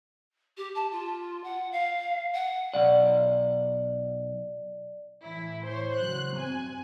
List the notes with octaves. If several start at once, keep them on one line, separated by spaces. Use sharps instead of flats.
G4
A5
F4
F#5
F5
F#5
B1 D5 F#5
A2 E3 E4
C5 C#5
C#3 F#3 F#6
G2 C4 G#5